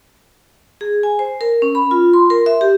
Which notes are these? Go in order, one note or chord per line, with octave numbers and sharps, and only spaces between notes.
G#4
G#5
C5
A#4
C#4
B5
F4
C6
A#4
E5
G4